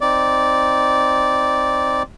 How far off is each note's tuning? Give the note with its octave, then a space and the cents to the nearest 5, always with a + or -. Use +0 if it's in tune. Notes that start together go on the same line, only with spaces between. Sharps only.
C4 +0 D#4 +0 D5 -10